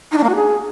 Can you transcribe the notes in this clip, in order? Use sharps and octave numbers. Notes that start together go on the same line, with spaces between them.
D#4
D4
A#3
F#4
G#4